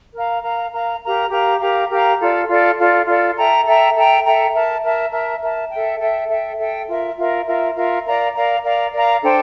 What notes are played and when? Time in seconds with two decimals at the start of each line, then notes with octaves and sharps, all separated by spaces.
0.15 A#4 F5 A#5
0.44 A#4 F5 A#5
0.73 A#4 F5 A#5
1.02 G4 A#4 F5 A#5
1.31 G4 A#4 F5 A#5
1.61 G4 A#4 F5 A#5
1.90 G4 A#4 F5 A#5
2.20 F4 A4 D5
2.48 F4 A4 D5
2.78 F4 A4 D5
3.07 F4 A4 D5
3.37 A4 E5 G5 A#5
3.66 A4 E5 G5 A#5
3.95 A4 E5 G5 A#5
4.24 A4 E5 G5 A#5
4.53 A#4 E5 A5
4.83 A#4 E5 A5
5.12 A#4 E5 A5
5.42 A#4 E5 A5
5.71 A4 E5 G5
6.00 A4 E5 G5
6.29 A4 E5 G5
6.59 A4 E5 G5
6.88 F4 A#4 E5
7.17 F4 A#4 E5
7.47 F4 A#4 E5
7.75 F4 A#4 E5
8.05 A#4 D5 F5 A#5
8.34 A#4 D5 F5 A#5
8.63 A#4 D5 F5 A#5
8.93 A#4 D5 F5 A#5
9.23 D4 A4 C5 G5